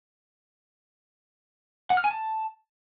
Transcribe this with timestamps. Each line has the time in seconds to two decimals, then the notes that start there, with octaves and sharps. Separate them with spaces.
1.90 F#5
1.97 F6
2.04 G#5
2.11 A5